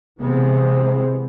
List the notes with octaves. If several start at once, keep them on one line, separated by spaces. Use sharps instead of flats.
C3 E3 G#3 B3 C4